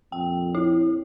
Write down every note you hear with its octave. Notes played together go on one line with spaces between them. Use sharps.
F2 A#2 G5
E4